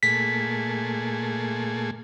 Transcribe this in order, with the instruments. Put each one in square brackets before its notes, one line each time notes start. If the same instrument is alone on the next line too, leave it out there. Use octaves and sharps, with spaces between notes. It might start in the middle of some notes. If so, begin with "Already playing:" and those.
[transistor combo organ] A#2 A3 G#4 [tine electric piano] B6